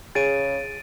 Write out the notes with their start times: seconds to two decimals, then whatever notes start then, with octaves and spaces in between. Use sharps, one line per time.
0.15 C#3 G#4 A6 D7 D#7